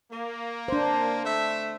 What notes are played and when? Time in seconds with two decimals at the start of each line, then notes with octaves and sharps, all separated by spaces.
0.12 A#3
0.68 D4 C5
1.25 A3 E5